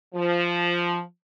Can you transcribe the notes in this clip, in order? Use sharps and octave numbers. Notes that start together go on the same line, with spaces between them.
F3